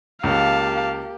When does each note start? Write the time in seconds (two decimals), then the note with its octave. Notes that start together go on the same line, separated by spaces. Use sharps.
0.24 C#2 A#3 G4 F5 A5